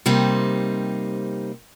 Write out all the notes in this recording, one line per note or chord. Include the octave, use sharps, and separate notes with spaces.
C3 G3 A#3 C4 D#4